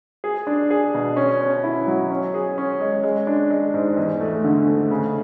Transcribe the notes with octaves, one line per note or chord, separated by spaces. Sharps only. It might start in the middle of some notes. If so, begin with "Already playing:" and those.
G#4
D4
G#4
B2
C#4
C#4
E4
F#3
C#4
G#4
C#4
G#3
G#3
D4
G#3
G#2
E2
A3
D3
A3
C#3